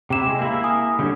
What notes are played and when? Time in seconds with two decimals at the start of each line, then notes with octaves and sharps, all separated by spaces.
0.10 C3 E4 G5 D6 E7
0.26 G#3
0.39 A#3 E4
0.64 G#5 D#6
0.99 D3 G3 C#4